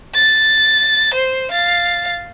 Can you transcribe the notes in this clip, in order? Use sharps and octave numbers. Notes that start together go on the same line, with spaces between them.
A6
C5
F5 A6